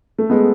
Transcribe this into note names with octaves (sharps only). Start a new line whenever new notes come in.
A3
G#3 B3